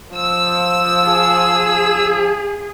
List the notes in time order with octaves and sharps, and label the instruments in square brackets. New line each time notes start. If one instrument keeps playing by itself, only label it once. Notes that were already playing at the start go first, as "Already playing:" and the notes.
[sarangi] F3 [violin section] E6
[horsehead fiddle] G#4